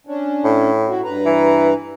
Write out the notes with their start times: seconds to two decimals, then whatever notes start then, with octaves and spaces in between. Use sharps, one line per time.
0.07 C#4 D4
0.45 A2
0.88 E4 F#4
1.04 G2 B4 A#5
1.26 E3